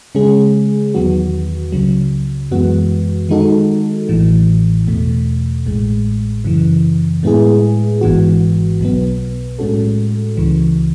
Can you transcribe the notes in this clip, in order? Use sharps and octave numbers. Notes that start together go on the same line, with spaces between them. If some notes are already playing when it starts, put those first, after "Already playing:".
C#3 G#3 C#4 G#4
E2 D#3 F#3 B3 F#4
C#2 C#3 F#3
F#2 E3 G#3 B3 F#4
D#3 G#3 D#4 F#4 A4
A1 A2 E3
E2 B2 A3
A1 A2 G#3
F#2 C#3 E3
A2 G#3 B3 E4 G#4
G#1 G#2 E3 B3 F#4
B1 B2 F#3 B3
A2 G#3 C#4 F#4 A4
C#2 C#3 E3